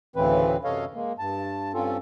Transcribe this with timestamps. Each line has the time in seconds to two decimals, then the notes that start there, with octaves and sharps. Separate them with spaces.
0.16 D2 A2 C#3 E3 C4 B4
0.64 F#2 C3 A4 C#5 D#5 F5
0.95 G#3 A#3
1.19 G2 A5
1.74 G2 C4 C#4 F4 A4